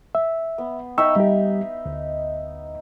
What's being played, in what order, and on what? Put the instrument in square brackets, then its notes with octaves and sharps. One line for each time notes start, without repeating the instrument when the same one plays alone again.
[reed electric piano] E5
[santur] B3
[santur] D#4 E5 [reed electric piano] G5 C#6 E6
[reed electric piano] G3 G4
D2